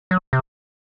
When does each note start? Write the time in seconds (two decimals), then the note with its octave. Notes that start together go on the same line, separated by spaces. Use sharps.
0.11 F#3
0.33 C3